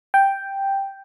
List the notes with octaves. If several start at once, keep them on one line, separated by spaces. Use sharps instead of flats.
G5